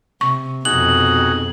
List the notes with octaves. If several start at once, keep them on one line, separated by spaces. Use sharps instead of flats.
C3 C#6
F2 B2 D#4 F#4 G#4 F#7